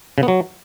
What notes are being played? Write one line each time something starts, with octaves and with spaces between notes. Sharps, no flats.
C#3
B3
F#3